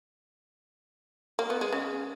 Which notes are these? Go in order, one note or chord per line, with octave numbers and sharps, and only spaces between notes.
A#3
B3
G#3
C#3